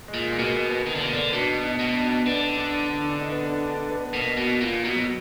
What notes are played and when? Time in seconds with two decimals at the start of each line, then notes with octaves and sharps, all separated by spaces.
0.08 G#3
0.14 A#2
0.32 G#3
0.39 B2 A#3
0.70 B3
0.86 D#3
0.95 D3
1.01 B2 A#3
1.13 D3
1.32 B2 D4
1.64 D#4
1.80 B2
1.95 D4
2.26 D3 B3
2.57 D4
2.89 D4
3.10 D4
3.20 D#4
3.32 B3
3.43 D4
3.67 D4
3.90 B3
4.06 B3
4.14 B2 A#3
4.37 B2
4.61 A#2
4.85 B2
4.96 F#3